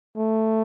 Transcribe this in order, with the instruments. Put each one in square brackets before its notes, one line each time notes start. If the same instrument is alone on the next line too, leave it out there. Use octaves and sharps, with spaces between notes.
[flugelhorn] A3